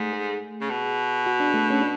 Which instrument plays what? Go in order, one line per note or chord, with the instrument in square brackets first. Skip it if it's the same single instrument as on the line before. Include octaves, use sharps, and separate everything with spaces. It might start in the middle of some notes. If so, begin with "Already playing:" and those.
Already playing: [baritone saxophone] G#2 [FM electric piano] A3
[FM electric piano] G#4
[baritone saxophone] C#3
B2
[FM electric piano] F#4
D4
A3
C#4
D4